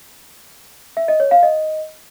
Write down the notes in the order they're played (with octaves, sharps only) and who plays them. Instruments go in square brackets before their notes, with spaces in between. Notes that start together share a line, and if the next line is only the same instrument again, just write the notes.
[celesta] E5
D#5
C#5
F5
D#5